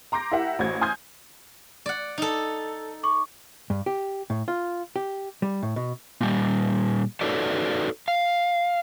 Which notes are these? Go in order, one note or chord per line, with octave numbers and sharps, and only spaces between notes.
A#5 C6 D6 G6 A#6
E4 G4 A#4 E5 F#5
A1 F#4 C5 G#6
G#5 C6 D#6 F6 G6 G#6
D5 F#5
D#4 A4
C#6 D6
G2
G4
A2
F4
G4
G3
A2
B2
A#2 G3
D#4 F#4 A4 B4 C#5 D5
F5